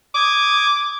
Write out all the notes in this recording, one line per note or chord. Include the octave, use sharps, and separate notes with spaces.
D6 D#6 G#6